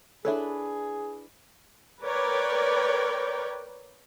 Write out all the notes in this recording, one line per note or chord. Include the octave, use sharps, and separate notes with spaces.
D4 E4 G#4 A4 B4 C#5 E5
A#4 B4 C#5 D5 G5